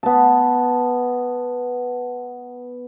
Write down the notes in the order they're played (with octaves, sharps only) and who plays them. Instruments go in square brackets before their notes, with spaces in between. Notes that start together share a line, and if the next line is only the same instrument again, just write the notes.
[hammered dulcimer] B3 A5